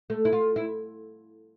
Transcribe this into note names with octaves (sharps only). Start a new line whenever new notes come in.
A3
E4
F4
E4